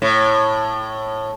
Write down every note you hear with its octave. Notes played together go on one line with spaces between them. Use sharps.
A2